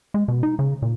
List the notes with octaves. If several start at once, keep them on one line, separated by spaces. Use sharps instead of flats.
G#3
B2
D#4
C#3
A#2